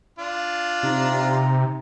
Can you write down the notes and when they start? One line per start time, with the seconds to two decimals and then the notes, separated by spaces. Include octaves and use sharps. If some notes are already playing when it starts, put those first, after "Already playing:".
0.19 D4 F4
0.83 C3 D#4